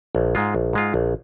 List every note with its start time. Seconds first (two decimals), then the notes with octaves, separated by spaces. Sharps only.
0.15 A#1
0.35 G#2 G#3 F4
0.55 A#1
0.73 G#2 G#3 F4
0.94 A#1